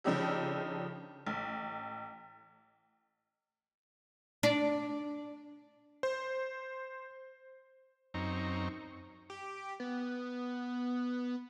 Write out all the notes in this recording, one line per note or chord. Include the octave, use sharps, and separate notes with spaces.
C#3 F3 D4 D#4 G4 A4
A1
D4
C5
F#2 C4 D#4 A#5 C#6
G4
B3